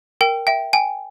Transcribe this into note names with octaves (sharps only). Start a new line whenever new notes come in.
A#4 G5
E5 G5
G5 G#5